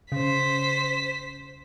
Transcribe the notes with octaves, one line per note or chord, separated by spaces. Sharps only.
C#3 C5 B6